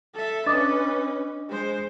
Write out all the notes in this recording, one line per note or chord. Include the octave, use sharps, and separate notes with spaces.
A4 E5
C#4 D4 B4 D#5 D6 D#6 A6
G#3 C5